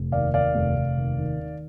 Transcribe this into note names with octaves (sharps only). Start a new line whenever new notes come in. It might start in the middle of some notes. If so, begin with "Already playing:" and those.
Already playing: F1
D#2 D5 F5
D#2 D5 F5
F1
F1
D#2
D#3
D#3